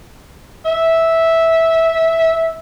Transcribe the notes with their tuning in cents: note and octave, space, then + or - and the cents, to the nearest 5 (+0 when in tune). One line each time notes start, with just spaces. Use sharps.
E5 -10